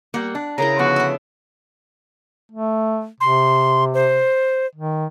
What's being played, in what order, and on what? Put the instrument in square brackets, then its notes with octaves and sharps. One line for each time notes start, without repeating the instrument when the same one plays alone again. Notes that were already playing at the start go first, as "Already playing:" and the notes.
[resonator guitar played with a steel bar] G3 A#3 [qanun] F#5
[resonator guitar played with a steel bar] D4
[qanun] C#3 E4 [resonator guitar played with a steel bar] G#4 A#4 [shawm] A#5
[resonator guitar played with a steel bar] D3 F3 B3 [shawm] F#4
[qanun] E5 F#5
[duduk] A3
[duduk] C3 [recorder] C6
[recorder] C5
[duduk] D#3